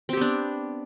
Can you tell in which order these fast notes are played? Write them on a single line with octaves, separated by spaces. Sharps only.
C4 G4 B3 D4